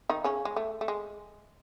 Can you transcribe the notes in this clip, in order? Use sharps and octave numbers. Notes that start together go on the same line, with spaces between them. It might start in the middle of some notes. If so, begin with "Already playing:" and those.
D#3 D#4
C#3 C#4
G#3
A3
A3
G#3